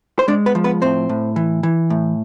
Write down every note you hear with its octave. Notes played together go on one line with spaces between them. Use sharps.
C5
G#3 D4 D5
B3 B4
F3
B3 B4
A2 C4 C5
A2
E3
E3
A2